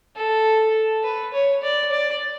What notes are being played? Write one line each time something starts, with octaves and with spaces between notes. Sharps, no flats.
A4
B4
C#5
D5
D5